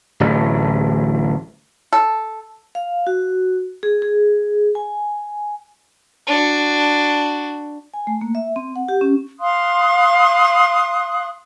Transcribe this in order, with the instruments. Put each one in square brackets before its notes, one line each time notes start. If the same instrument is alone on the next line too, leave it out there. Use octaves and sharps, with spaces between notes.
[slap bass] D1 A1
[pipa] A4
[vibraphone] F5
F#4
G#4
G#4
G#5
[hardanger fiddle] D4 F#4
[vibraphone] G#5
A3
A#3
E5
C4
F#5
G4
C#4
[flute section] F5 C6 D#6 F#6